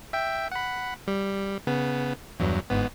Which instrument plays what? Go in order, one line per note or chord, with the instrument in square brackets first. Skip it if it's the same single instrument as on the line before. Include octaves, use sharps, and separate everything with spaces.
[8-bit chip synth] E5 G5
F#5 B5
G3
C#3 B3
E2 G2 F#3
G1 G#2 B3